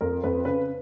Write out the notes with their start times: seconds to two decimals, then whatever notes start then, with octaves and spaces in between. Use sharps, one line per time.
0.01 F2 A#4
0.23 F2 B4
0.45 C#3 B4